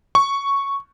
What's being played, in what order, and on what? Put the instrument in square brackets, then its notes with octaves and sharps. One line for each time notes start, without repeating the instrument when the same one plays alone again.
[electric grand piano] C#6